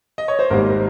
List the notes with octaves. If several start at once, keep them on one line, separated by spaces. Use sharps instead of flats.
D#5
C#5
C5
G#1 G#2 G3 A#3 A#4